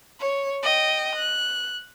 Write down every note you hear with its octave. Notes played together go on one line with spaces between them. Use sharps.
C#5
D#5 G5
F#6